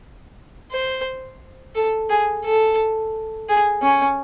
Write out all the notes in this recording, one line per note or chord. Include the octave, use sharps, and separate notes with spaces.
C5
A4
G#4
A4
G#4
C#4